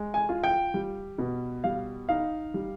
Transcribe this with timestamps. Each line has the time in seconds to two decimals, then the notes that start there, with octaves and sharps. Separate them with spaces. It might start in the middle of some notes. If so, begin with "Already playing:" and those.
Already playing: G#3
0.14 G#5
0.29 F4
0.44 G5
0.74 G3
1.18 B2
1.64 G3 F5
2.09 D#4 F5
2.54 G3